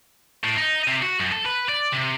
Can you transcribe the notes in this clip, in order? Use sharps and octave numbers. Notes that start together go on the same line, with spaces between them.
A2
D#4
C3
F#4
F#2
A4
B4
D5
C3